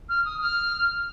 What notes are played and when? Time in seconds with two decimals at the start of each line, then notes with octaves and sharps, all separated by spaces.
0.09 F6
0.25 D#6
0.41 F6